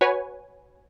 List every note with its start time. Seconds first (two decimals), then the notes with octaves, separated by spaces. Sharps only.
0.01 F#4 B4 C#5 G#5